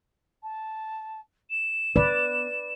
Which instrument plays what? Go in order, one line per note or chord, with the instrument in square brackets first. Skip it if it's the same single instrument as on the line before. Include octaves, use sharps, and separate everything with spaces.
[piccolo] A5
E7
[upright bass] B3 [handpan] B4 D5